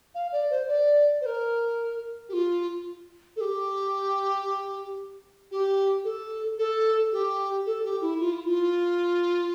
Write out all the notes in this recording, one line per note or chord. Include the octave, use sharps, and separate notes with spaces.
F5
D5
C5
D5
C5
A#4
G4
F4
A4
G4
G4
A4
A4
G4
A4
G4
E4
F4
E4
F4